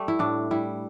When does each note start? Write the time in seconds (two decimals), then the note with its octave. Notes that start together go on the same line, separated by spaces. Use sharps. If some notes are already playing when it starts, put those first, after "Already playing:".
Already playing: G3 A3
0.08 E4
0.19 A2 D4
0.51 G3 E4